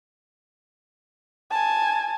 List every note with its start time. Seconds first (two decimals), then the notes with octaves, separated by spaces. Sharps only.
1.51 G#5 A5